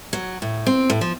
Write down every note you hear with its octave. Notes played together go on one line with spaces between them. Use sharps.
F#3
A2
C4
A2
F3